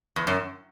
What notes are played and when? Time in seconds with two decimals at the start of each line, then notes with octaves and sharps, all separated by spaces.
0.16 E2
0.27 F#2